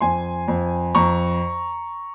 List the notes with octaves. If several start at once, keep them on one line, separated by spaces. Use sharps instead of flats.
F2 G#5 C6
F2
F2 A#5 C#6